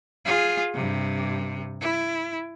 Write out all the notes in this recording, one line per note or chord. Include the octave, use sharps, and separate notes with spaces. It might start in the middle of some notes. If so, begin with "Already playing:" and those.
F4 G#4
G2 C3
E4